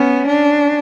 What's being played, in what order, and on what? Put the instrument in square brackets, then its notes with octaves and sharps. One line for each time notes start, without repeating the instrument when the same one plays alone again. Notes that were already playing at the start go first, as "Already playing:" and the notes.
Already playing: [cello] B3 [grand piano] C#4
[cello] D4